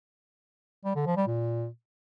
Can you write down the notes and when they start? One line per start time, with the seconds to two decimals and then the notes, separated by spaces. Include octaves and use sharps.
0.85 G3
0.96 D3
1.06 F3
1.17 G3
1.27 A#2